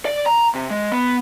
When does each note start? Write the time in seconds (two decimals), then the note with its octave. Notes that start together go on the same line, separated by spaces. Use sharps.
0.05 D5
0.26 A#5
0.55 C3
0.70 G#3
0.92 B3